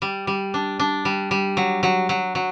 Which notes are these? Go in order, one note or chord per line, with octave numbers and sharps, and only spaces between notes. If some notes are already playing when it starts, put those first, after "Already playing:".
G3
G3
D4
D4
G3
G3
F#3
F#3
F#3
F#3